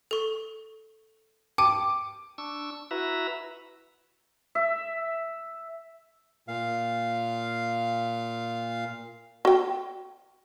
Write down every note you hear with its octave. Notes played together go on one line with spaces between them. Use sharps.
A4 C#6
G5 A5 D6
D4 C#6 E6
E4 F#4 B4 E5 A#5
E5
A#2 F5
F#4 G5